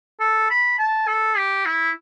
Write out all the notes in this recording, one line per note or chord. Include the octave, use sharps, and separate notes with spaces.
A4
B5
A5
A4
G4
E4